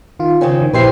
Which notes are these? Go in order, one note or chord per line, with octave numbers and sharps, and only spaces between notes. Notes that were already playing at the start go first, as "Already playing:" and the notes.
D#3 F4
C#3 C4 C#4
D#3
A#1 E4 G4 B4 C5 C7